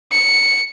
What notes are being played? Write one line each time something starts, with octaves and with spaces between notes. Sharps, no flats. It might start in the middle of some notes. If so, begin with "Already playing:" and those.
C#7